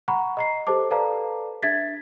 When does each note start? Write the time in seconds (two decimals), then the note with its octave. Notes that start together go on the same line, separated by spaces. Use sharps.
0.08 F#5 A#5 B5 C#6
0.37 D#5 A#5 C7
0.67 G4 A4 C5 A5 D6
0.91 A4 B4 D5 F5 A5 A#5
1.63 D4 E5 G#6 A6 B6